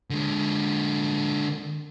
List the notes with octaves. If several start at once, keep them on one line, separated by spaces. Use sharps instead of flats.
D3 G#3